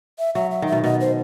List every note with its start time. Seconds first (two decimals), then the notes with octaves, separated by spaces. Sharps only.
0.19 E5
0.35 F#3 E5
0.51 E5
0.62 D#3 E5
0.72 B2
0.84 B2 D#5
1.01 C5